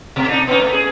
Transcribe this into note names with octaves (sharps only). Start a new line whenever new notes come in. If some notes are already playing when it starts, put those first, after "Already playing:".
B2 A3
D4 D#4
B3 C#4 D#4
A3
G#4